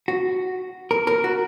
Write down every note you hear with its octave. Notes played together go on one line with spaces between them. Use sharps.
F#4
A#4
A#4
F#4